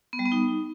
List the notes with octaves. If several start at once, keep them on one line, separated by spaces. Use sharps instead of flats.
B3
G3
B3
D#4